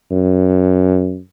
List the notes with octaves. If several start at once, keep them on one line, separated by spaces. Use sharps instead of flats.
F#2